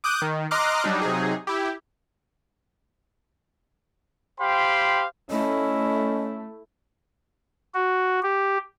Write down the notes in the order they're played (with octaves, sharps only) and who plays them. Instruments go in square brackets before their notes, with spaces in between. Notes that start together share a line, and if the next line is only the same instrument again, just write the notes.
[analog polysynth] D6 D#6 F#6 G6
D#3
D#5 A#5 C6 D6 F6 F#6
F#3 G3 D4 D#4
C3 F#3 D#4 G#4
E4 G4
[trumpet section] G4 C5 F5 G5 B5 C6
[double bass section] A3 [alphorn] C#4 [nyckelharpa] E4 [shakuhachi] D#5
[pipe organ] F#4
G4